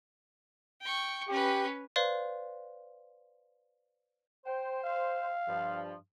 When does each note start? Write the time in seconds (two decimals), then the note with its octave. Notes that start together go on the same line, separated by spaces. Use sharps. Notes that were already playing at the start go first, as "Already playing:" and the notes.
0.81 G5 C#6
1.29 C#4 G4 B4
1.96 B4 C5 D5 F5 C6
4.46 C5 G5
4.84 F5
5.47 G2 F3